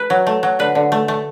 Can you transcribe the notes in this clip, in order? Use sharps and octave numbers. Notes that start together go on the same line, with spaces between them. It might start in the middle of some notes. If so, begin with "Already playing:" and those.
Already playing: B4
F#3
A3
F#3
D3 B4
D3
A3
A3